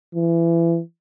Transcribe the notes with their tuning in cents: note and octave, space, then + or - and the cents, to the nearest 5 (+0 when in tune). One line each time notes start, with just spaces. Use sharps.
E3 +25